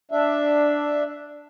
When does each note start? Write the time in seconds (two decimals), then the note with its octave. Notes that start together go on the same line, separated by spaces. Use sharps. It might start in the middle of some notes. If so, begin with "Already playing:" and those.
0.11 D4 E5